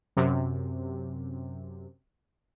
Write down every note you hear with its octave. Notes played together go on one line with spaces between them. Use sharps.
F#2 C3